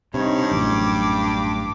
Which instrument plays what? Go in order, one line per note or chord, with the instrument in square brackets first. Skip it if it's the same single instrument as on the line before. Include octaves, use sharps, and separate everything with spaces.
[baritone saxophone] G2 [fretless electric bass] C3 [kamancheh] D#4 C#5
[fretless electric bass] A1 F#2 [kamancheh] D6